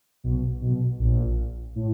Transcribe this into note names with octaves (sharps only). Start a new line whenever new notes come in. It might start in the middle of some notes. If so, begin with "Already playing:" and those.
B1 B2
B1 B2
A#1 A#2
A2